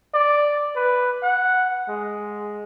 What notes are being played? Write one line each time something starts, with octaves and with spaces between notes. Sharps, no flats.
D5
B4
F#5
G#3